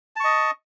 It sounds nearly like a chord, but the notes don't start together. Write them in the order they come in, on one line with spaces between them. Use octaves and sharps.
A5 C#6 D#5